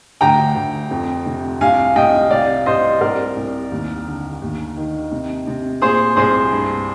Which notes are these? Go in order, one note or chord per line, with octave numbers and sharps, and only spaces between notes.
D2 G5 A#5
D2
F2
C3
C2 F5 G#5
C2 D#5 G5
C3 D5 F5
C2 C5 D#5
C2 A#4 D5
C2
D#2
D3
D#2
D#3
C3
C3
A#2 G#4 C5
C2 G#4 C5
G2